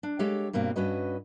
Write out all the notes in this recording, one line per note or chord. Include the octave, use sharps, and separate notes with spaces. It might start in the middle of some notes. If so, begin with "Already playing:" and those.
D4
G#3 G4 A4 C#5 F5
G2 B2 A#3 C4
G2 C#4 F#4 B4 D#5